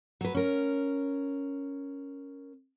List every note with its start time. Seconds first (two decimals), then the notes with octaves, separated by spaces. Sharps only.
0.21 F#3 B4
0.35 C#4 A#4